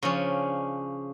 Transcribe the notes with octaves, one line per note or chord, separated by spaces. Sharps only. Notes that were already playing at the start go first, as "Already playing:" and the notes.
C#3 F3 C#4 D4